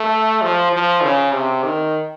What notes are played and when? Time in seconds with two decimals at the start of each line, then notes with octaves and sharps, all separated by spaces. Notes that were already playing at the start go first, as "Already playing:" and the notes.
Already playing: A3
0.42 F3
0.73 F3
1.03 C#3
1.33 C3
1.64 D#3